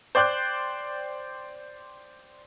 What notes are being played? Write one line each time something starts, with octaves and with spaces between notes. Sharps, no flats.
C5 D5 G5 D6 F#6 G6